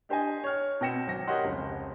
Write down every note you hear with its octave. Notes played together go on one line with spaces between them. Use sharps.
D4 G4 C5 D#5 G#5
C#5 F6
B2 C4 G5 A#6 C#7 E7
G#1 F#3 A#6
G4 A#4 C#5 D#5 F#5 C6
F1 C#2